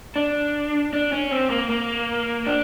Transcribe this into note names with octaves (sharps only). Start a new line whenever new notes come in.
D4
D4
C#4
C4
A#3
A#3
D4